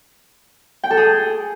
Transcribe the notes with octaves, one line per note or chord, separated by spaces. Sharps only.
G5
A4
G#4